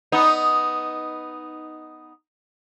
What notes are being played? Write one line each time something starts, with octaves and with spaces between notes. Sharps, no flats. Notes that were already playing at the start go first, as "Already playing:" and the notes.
B3 D#4